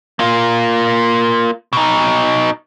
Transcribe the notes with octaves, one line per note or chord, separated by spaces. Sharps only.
A#3 F4
B2 D#4